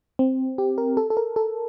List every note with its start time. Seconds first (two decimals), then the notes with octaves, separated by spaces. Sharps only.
0.19 C4
0.58 G4
0.78 A#4
0.97 A4
1.10 A4
1.17 A#4
1.36 A4